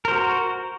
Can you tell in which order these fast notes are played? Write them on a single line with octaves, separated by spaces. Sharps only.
A#4 C5 F#4